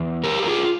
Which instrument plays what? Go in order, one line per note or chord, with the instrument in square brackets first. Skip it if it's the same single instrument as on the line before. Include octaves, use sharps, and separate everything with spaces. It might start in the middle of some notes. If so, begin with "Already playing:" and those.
Already playing: [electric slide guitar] E2
G3 G4 A#4
A#4
F4 G#4